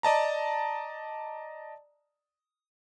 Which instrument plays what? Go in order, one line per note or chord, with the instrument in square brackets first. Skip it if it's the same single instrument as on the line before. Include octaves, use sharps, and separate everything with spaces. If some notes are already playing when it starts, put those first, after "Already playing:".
[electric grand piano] D5 D#5 A5 A#5